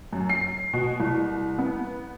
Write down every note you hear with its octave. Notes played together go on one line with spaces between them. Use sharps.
F#2
C7
B2
C2
B3